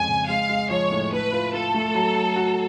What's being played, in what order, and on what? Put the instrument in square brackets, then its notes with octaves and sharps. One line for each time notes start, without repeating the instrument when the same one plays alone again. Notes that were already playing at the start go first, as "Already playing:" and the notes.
Already playing: [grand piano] F2 F3 G#3 C#4 [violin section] G#5
[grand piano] C#3
[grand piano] G#3 [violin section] F5
[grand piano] G#3
[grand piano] F3 [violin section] C#5
[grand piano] A2
[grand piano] A3 [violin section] B4
[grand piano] F4
[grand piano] F4 [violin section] A4
[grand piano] A3
F#3
F#3
F#4